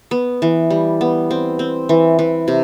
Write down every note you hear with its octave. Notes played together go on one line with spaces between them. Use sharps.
B3
E3
G3
B3
C4
C4
E3
E3
C3